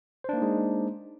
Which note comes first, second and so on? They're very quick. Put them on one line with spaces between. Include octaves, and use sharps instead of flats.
C5 D4 A#3 D#4 G#3